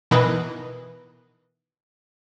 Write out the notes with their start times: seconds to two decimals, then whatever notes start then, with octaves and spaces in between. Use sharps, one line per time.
0.11 B2 D#3 E3 B4 D#5